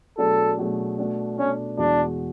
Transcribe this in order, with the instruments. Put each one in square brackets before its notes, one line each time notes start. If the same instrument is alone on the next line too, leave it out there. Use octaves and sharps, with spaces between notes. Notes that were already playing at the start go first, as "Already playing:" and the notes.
[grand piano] B2 F#3 A3 D4 G#4 [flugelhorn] A4
[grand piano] B2 F#3 A3 D4 G#4
B2 A3 D4
[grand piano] B2 A3 D4 [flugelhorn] C#4
[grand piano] E2 B2 G#3 B3 F#4 [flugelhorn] D4